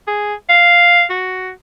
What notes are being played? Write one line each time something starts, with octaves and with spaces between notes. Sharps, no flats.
G#4
F5
F#4